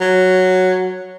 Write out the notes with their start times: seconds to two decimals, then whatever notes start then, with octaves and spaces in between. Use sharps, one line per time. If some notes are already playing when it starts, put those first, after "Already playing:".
0.01 F#3